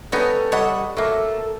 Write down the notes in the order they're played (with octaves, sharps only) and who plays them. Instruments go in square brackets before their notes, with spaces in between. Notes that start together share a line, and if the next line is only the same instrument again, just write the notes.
[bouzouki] G3 C#4 [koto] B3 D#4 C#5 [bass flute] A4
[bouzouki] G3 D#5 F#5 [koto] C#5
[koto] F#3 A#3 [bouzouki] A3 [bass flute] A4